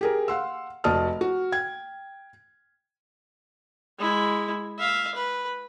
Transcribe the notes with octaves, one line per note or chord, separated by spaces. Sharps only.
G4 G#4 A#4
F5 F#5 C6 E6
F1 F#4 D5 A5 D#6 F6
F#4
G5 G#6
G#3 E4
E5 F5
B4